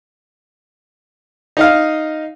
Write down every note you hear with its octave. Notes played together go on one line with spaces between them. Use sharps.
D#4 D#5 F5